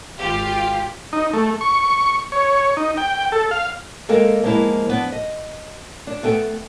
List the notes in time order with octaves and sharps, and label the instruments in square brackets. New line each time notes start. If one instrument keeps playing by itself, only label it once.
[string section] G#1 F4 G4 F5
[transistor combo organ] D#4
A3
C#6
C#5
D#4
G5
A4
F5
[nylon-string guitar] G#3 A#3 A4 A#4 F5 G5
F3 G#3 A#3 B3 E4
F3 B3 D4
D#5
D4
A3 B3 A4 G5